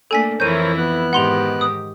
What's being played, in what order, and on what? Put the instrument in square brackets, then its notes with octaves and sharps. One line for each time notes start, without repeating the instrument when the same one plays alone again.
[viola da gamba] A3 A#3 D4 [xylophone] A4 G#5 B6
[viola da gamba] F2 E3 E4 [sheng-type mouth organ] A#4 C5 C#5 [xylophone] G6 D#7
[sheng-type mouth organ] B3 F#6
[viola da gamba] G#2 D#3 G4 [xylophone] F#5 C6 F7
[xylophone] D#6